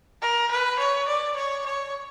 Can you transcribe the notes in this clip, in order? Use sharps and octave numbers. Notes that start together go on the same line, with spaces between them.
A#4
B4
C#5
D5
C#5
C#5